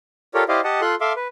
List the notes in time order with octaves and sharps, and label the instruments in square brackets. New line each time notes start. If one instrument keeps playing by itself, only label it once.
[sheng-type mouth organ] F4 G4 A4 A#4 C#5 D5
E4 G4 C5 D5 D#5 F5
G4 D#5 F#5 A5
F4 A4 C6 F#6
A4 E5 F5 C6 D6
B4